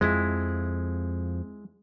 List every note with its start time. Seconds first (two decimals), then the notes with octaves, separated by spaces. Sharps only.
0.01 F2 F3 G#3 E4